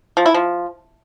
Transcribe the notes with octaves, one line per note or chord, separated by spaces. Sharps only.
F3
E4
F3